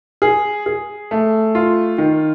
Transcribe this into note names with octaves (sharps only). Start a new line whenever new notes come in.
G#4
G#4
A3
F4
D#3